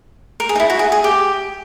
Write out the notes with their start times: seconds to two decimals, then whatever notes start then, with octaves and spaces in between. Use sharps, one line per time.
0.40 A#4
0.49 G#4
0.56 D#4
0.60 E4
0.70 F#4
0.79 G#4
0.92 G#4
1.04 G4